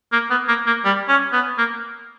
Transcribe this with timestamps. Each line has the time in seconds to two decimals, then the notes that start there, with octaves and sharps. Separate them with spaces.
0.12 A#3
0.30 B3
0.48 A#3
0.67 A#3
0.84 G3
1.09 C#4
1.32 B3
1.58 A#3